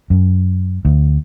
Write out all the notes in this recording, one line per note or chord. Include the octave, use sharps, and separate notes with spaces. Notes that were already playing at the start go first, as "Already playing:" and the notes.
F#2
D2